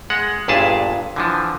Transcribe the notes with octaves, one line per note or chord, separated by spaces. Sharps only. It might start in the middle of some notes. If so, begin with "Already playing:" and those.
G#3 F#5
G1 G2 A#2 E4 G#4 A5
D3 E3 F3